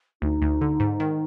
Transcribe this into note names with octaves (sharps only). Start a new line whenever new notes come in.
D2 D#4
D2
D3
G#2
D#3